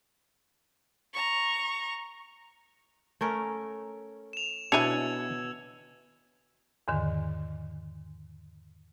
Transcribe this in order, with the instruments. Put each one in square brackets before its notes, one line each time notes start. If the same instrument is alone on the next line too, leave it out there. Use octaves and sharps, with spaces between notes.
[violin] A#5 C#6
[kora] A3 C#4 A#4
[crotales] E7 F7
[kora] B2 [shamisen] D4 E4 [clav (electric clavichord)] C#5 G#5 [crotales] E6 G#6
[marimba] E2 G#2 D3 D#3